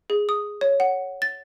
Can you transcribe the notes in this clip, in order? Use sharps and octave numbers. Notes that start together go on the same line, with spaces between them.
G#4
D#6
C#5
F#5
A6